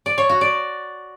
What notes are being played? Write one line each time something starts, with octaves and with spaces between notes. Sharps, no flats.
D5
C#5
F#4
D5